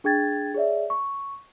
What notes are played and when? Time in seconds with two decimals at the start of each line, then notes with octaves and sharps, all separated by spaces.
0.04 D4 G#4 G5 G#6 A6
0.54 G#4 C#5 D5 E5
0.90 C#6